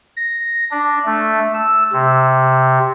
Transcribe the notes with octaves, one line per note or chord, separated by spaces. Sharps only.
A#6
D4
A3
E6
C3